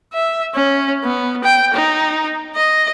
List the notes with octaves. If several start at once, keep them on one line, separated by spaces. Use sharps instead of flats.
E5
C#4
B3
G5
D#4
D#5